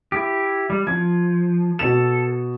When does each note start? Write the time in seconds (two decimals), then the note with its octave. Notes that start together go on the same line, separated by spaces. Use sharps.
0.12 E4 G4
0.70 G3
0.87 F3 G#6
1.79 B2 A4 E7